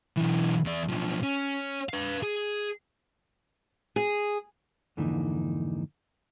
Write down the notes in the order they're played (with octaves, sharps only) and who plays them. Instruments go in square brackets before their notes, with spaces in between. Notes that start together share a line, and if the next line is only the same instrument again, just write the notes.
[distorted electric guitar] B1 E3
E2 D5
B1 F3
C#4
B4 F5
G#4
[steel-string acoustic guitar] G#4
[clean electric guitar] F2 G#2 D3 E3 A#3 D#4